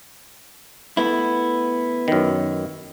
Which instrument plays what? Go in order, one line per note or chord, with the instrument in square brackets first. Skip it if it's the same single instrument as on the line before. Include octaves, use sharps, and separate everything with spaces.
[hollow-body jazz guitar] A3 B3 E4
[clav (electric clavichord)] F#2 D#3